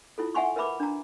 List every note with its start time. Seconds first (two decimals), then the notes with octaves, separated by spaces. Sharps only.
0.18 E4 F4 A4
0.34 E5 F#5 G#5 C6 C#6
0.56 A#4 B4 E5 B5 D6
0.80 D4 A#5